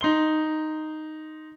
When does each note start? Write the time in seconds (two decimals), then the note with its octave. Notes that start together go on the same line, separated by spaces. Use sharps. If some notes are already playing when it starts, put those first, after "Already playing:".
0.01 D#4 C6 G7